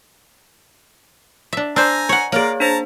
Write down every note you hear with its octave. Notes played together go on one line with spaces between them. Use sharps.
D4 E5
D4 C5 G#5 A#5 E6 G6
C#5 F#5
A#3 G#4 C#5 D5 F5 A#5
D4 C5 A5 A#5